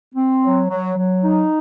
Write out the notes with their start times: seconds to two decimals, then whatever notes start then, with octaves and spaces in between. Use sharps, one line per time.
0.13 C4
0.41 F#3
0.69 F#3
0.96 F#3
1.23 D#4